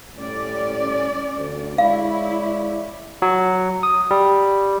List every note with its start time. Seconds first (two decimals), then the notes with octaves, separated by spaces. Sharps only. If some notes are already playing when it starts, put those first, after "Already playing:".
0.16 A2 G3 C#4 D5
1.37 D2
1.78 G#3 E4 C#5 D5 F5
3.22 F#3
3.83 D#6
4.11 G3